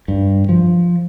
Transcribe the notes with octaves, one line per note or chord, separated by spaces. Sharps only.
G2
F3